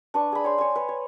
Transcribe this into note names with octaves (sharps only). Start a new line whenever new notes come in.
D4 B4 C#6
G#4 B5
C#5 G5 C6
C#5 G#5
B4
C#5